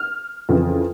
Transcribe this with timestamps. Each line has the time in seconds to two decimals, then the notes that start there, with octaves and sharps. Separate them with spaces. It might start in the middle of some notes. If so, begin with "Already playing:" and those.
Already playing: F6
0.49 F2 C#3 E3